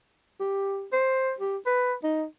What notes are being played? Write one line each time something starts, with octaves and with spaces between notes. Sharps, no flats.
G4
C5
G4
B4
D#4